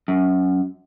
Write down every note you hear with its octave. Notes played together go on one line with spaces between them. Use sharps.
F#2